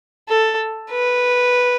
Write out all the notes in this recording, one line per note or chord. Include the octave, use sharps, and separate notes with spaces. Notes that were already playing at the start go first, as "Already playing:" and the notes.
A4
B4